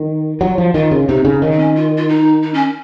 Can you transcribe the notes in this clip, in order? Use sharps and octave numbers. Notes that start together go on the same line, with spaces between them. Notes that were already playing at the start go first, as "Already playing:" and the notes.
Already playing: D#3
F#3 F4
F3
D#3 F4
C#3
C3 D#4
C#3
D#3 C#4
C4
C#4
F4
F4
D#4
D#4
C#4